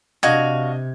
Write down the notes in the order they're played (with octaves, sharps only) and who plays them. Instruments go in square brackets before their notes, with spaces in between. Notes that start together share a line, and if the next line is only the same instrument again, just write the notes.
[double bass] C3 [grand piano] D4 D#5 G#6 [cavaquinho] F#4 F5